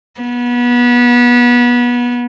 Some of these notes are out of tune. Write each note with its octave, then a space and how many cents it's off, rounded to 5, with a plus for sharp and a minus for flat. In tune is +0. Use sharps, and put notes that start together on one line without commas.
B3 -25